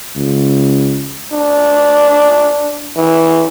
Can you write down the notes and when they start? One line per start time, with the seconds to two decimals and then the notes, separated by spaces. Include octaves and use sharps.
0.16 C#2
1.32 D4
2.96 E3